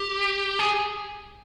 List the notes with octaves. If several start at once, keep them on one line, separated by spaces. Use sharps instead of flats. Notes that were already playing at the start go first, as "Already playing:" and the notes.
Already playing: G4
G#4